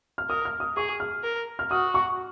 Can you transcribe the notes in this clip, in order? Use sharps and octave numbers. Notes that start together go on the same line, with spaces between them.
F6
A#4 D#6
F6
D#6
G#4 C#6
F6
A#4
F6
F#4 D#6
C#6